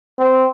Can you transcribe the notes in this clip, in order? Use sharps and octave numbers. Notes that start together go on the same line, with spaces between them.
C4